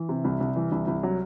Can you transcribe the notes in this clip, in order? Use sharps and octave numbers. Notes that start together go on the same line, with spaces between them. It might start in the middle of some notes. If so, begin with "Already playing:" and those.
Already playing: E3
C3
C2
C2
E3
C2
C2
F#3